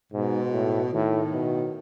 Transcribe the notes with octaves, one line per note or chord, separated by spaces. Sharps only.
G#2 B2
A2
A2 D#3
B2